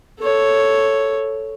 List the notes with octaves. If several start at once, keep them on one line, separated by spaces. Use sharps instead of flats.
A4 C#5